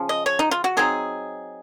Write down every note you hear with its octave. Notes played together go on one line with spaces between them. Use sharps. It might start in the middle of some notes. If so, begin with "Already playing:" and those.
Already playing: C#3 F3
D#5
C#5
D#4
F4
F#4
F#3 C4 D#4 G#4